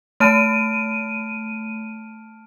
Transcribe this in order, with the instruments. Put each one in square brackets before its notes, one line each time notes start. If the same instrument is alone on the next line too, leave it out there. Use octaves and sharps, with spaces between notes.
[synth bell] A3 D#7 [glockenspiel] A5 F6 D7